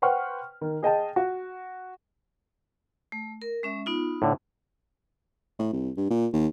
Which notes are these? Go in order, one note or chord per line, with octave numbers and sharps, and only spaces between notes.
B4 C5 F#5 G5 C#6 F6
D#3
G#4 D#5 G5 A5
F#4
A3
A#4
G#3 C#4 E5
B3 D#4 F4
A2 D3
A2
C2
G2
A#2
D#2